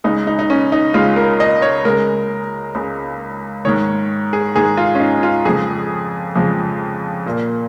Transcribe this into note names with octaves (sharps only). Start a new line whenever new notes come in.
C#2 C#3 G#3 D#4
D#4
D#4
C#4
D#4
C#2 C#3 G#3 F4
A#4
D#5
C#5
C#2 C#3 G#3 A#4
C#2 C#3 G#3
G#2 D#3 G#3 C#5
G#4
G#2 D#3 G#3 G#4
F4
C#4
D#4
F4
F2 C#3 F3 G#3 G#4
F2 C#3 F3 G#3
A#2 A#3